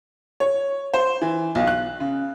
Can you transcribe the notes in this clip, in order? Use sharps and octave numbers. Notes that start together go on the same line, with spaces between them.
C#5
C5
E3
B1
F#6
C#3